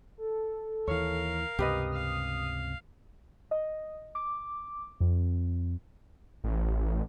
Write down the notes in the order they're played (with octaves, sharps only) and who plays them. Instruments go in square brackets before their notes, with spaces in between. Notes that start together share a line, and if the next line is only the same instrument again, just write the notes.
[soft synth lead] A4
[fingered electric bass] D#2 E3 [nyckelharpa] A#4 F5 [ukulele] C#5
[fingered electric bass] C#2 G2 C3 [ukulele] G4 B4 D#5 [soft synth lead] D#6
[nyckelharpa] F5
[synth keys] D#5
D6
F2
[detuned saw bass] A1